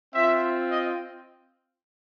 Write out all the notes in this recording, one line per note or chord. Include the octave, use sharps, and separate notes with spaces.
C4 F4 E5
D#5